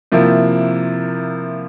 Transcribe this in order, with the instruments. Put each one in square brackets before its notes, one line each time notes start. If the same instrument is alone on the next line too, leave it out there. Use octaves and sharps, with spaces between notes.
[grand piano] C3 F3 A#3 E4